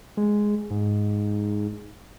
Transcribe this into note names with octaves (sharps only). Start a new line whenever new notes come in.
G#3
G#2